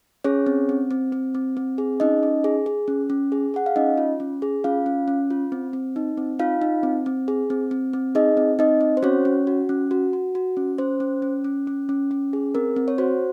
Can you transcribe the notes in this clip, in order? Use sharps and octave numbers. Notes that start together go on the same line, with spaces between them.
C#4 G#4 C#5
C4
C4
C4
C4
C4
C4
G#4
C#4 D#4 D#5
C#4
G#4
G#4
C#4
C#4
G#4
G#4 F#5
F5
C#4 D#4 D#5
F4
C#4
G#4
C#4 F4 F5
C#4
C#4
F4
C4
C4
D#4
C4
D#4 F4 F5
D#4
C4
C4
G#4
C4
C4
C4
D#4 G#4 D#5
C4
C4 D#4 D#5
C4
C5
C#4 F#4 C#5
C#4
F#4
C#4
F#4
F#4
F#4
C#4
C#4 C5
C#4
C#4
C#4
C#4
C#4
C#4
G#4
C4 A#4
C4
C#5
F#4 C5